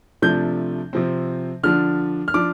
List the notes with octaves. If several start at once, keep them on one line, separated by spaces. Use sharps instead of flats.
C3 F3 A3 D4 G6
C3 F3 C4
D3 F3 D4 F6
F6
F3 D4 D6